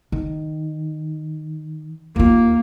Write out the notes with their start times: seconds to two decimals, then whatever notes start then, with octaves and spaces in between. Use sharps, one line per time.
0.12 D#3
2.16 D#2 A#3 F4